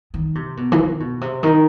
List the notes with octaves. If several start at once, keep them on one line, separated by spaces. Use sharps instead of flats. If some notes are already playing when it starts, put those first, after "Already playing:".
D#3
C3
B2
E3
D#3
B2
C3
D#3